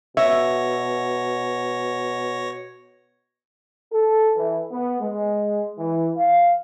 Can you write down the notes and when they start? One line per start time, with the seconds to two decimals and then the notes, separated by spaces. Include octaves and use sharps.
0.17 B2 C#5 E5 A#6
3.93 A4
4.36 E3
4.71 B3
5.01 G#3
5.78 E3
6.16 F5